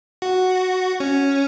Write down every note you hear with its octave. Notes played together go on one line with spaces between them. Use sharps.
F#4
C#4